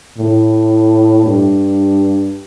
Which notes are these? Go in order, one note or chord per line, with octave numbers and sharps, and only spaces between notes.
A2
G2